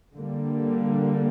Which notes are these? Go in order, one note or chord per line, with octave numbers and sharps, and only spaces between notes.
D3 G3 A#3